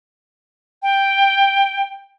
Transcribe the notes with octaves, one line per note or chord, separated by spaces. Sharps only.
G5